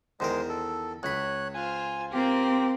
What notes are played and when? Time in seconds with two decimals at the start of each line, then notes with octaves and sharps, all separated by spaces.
0.20 E2 D#3 G#3 A#4 C5
0.49 A4
1.03 C#2 C#5 B5 F#6
1.55 F4 C5 G#5
2.12 A#3 C4 F4 G4